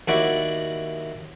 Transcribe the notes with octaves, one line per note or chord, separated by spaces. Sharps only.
D#2 E4 F#4 D5